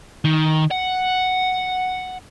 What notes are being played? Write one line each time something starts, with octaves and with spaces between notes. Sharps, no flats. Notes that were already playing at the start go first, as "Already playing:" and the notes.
D#3
F#5